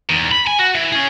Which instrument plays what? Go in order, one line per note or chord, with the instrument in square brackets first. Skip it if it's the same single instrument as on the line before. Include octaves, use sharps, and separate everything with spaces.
[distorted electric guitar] E2 D#3
B5
G#5
F#4
E3
C#4 G#4